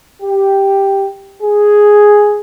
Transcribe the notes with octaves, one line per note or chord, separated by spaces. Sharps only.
G4
G#4